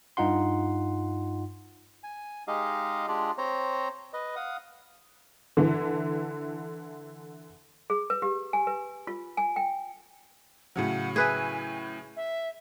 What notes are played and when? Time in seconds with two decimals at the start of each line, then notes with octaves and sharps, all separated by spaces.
0.17 G2 D#4 F4 F#5 C6
2.04 G#5
2.48 G#3 D#4 G4 G#4 D#5 F5
3.08 G#3 D4 F4 G4 G#4 D5
3.38 C4 C5 C#5 A#5
4.13 B4 D#5
4.36 F5 F#5 D#6
5.57 D3 E3
7.90 G#4
8.10 B4
8.22 G4
8.53 G#5
8.67 B4
9.07 F4
9.37 G#5
9.56 G5
10.76 A2 C#3 F#3 F#5
11.16 G#4 B4 E5 G#5
12.17 E5